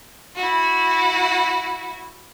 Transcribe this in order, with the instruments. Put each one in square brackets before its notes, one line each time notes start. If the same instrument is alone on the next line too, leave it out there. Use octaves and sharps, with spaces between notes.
[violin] E4 F#4